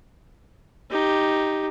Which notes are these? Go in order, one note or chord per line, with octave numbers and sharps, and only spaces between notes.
D#4 G4